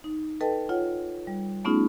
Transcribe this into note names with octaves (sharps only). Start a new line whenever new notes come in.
D#4
A4 B4 D#5 G5 A5
F4 C#5 F#5
G3
A3 B3 C#4 D#4 F4 G#4